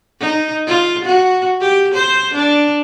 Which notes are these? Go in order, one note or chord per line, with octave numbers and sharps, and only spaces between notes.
D#4
F4
F#4
G4
C5
D4